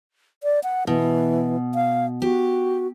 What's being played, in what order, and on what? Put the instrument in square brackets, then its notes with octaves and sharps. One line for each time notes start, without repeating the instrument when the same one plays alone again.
[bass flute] D5
F#5
[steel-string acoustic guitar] B2 [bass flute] E3
[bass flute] F5
[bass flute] F#4 [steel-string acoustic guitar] G4